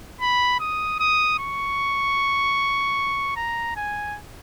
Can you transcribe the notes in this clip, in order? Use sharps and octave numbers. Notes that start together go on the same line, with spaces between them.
B5
D#6
D#6
C#6
A#5
G#5